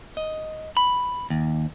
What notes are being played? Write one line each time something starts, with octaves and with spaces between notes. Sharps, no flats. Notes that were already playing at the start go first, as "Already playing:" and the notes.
D#5
B5
D#2